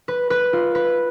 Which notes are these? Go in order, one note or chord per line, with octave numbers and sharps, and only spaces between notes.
B4
B4
F4
B4